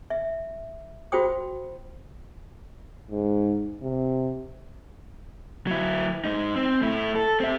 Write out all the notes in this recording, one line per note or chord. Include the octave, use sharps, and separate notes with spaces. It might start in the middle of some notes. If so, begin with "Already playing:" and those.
E5
F4 F#4 C5 G5 D#6
G#2
C3
F#3 E4
G#2 D#4
C4
A2 E4
A4
C4 E5